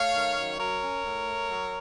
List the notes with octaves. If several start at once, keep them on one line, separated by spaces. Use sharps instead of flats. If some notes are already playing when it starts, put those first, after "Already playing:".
Already playing: A3 C#5 F5
D#3
F#2
F#3 A#4 C#5
C#4
A2
A3
F#3